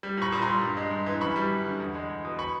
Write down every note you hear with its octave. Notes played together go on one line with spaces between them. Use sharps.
G3
A#2 B5 C#6
A#2
A#5 C6
G3
G2
G#3
G2
E3
F#2 B5 C#6
G3
F#2
D3
E2
G#3
E2
B2
B5 C#6